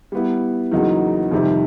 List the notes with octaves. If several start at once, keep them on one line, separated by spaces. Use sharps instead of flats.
G3 B3 E4
E2 C#3 F#3 A#3 D#4
F2 C3 D#3 G3